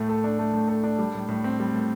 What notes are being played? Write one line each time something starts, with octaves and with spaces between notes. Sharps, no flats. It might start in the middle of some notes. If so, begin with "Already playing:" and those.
Already playing: A2 A3
A4
D4
A3
A2
A4
D4
G3
A2
A2
C4
G3
A2